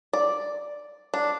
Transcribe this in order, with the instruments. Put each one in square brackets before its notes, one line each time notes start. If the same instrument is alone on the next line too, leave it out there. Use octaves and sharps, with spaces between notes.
[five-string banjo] D5
D4